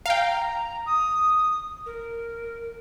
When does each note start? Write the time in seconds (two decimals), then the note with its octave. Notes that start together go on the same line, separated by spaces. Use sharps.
0.06 F5 G5 A#5
0.86 D#6
1.86 A#4